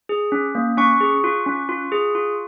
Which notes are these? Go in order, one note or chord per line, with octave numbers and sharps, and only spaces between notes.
G#4
C#4
A#3
C#4 C#6
G#4
F4
C#4
F4
G#4
F4